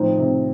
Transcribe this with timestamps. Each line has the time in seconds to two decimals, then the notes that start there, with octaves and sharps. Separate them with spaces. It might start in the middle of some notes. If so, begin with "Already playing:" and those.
Already playing: A2 D#3 F3 C4 D#4
0.18 C3